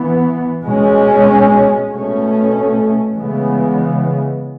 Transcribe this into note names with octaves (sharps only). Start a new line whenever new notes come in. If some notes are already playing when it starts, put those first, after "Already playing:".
Already playing: E3 B3
B2 G#3 C#4
B2 A3 C#4
C#3 E3 G#3 B3